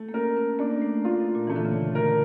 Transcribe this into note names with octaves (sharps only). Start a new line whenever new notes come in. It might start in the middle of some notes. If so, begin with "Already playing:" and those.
Already playing: A3
A#3
C#4 A#4
C#4
A#3 D4
A3
F4
A#2
E3 A3
D3
C#3
D3 A#4